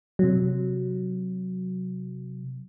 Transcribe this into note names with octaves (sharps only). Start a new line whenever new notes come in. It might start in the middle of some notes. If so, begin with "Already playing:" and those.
C3 F#3